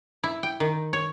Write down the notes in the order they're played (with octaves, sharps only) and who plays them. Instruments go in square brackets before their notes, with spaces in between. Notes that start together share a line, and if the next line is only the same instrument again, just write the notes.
[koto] E4
G5
D#3
C#5